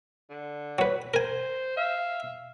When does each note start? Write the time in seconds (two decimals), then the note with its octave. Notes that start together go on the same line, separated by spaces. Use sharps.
0.30 D3
0.79 F#3 B4
1.14 A#4 C5 G#5
1.77 E5 F5